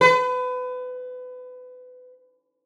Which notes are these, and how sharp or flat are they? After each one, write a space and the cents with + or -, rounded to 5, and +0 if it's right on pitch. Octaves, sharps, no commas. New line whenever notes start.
B4 +30